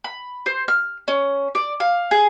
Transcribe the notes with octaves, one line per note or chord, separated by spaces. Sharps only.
B5
C5
F6
C#4
D5
F5
G#4